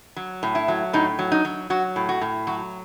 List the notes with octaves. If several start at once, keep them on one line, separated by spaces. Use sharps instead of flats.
F#3
A2
E4
F#3
A2 D#4
F#3
D#4
F#3
F#3 F#4
A2
F#4
A2
F#3 F#4